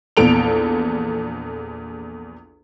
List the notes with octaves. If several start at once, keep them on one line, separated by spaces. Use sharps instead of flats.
A#1 E2 A4 D7 F7